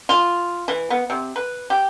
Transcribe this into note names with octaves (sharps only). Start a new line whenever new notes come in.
F4
E3
B3
C3
B4
G4